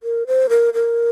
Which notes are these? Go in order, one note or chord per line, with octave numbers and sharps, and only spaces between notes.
A#4
C5
A#4
A#4